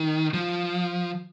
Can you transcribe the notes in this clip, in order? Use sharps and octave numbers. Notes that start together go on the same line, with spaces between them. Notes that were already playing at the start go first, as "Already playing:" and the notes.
Already playing: D#3
F3